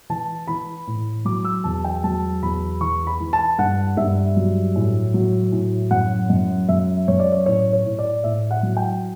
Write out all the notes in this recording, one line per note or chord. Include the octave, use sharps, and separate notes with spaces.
E3 A5
E3 B5
A2
F#3 D6
E6
E2 A5
G5
F#3 A5
E2 B5
E3 C#6
B5
E3
A5
G2 F#5
G2 E5
F#3
A2
F#3
A2
F#2 F#5
F#2
F#2 E5
F#2 C#5
D5
C#5
A2 C#5
C#5
A2
D5
A2 E5
F#5
F#3
G5